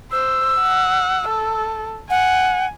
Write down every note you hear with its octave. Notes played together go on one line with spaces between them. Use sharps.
C5 E6
F#5
A4
F#5 G#5